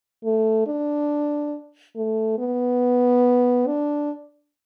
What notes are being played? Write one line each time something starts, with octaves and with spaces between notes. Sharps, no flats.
A3
D4
A3
B3
D4